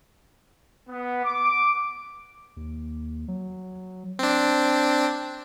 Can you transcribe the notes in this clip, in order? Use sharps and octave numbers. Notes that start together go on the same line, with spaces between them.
B3
D6
D#2
F#3
C4 D4